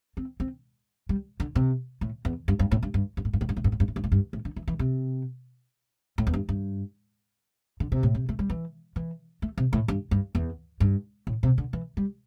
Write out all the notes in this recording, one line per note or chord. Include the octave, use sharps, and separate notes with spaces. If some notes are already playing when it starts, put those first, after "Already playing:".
C4
C4
G3
D3
C3
A2
E2
G2
G2
A2
G2
G2
G2
A2
G2
A2
G2
A2
G2
A2
G2
A2
G2
A2
G2
A2
D3
E3
E3
C3
A2
E2
G2
G2
D3
C3
A2
C3
A3
G3
E3
E3
A3
C3
A2
G2
G2
E2
G2
A2
C3
D3
E3
G3